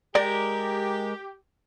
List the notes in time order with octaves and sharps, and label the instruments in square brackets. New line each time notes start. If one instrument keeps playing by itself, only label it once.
[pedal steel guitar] G#3 A#4 [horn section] G4 [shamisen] D5